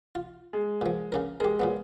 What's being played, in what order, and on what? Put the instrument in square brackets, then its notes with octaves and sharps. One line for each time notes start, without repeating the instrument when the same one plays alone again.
[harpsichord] F4
[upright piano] G#3
[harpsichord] A#2 F3
C#3 C#4 A#4
[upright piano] G#3 [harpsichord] G4 A#4
[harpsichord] A#2 F#3 B3